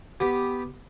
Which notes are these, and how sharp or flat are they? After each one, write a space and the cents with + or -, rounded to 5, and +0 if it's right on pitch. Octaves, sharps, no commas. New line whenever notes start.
B3 +0 G4 +0